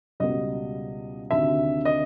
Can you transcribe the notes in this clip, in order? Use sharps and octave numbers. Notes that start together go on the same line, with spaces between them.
C#2 B2 G3 B3 D#5
D2 C3 D#3 E5
D#5